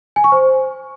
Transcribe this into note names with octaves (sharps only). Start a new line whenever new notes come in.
G#5
C#6
C5